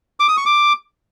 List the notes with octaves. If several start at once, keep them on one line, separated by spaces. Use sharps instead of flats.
D6
D#6
C#6
D6